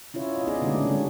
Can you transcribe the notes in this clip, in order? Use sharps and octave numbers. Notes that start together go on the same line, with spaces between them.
C#4 E4 F4 C#5
F4 D#5
B3 D#4 G#4 D5 D#5
D3 G#3 A3 C#4 D4 F#4
C#3 A3 C#4
G3